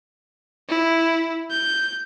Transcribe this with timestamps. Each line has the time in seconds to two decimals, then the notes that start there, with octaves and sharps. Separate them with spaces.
0.69 E4
1.51 G6